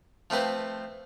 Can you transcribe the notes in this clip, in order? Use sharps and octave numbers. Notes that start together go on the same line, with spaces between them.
F3 A3 C4 B4 C5